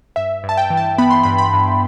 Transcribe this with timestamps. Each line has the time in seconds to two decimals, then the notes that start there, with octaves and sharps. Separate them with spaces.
0.16 G2 E5
0.43 G2
0.49 A5
0.57 G5
0.70 E3
0.77 A5
0.98 B3 B5
1.10 C6
1.23 G2 B5
1.38 B5
1.53 G2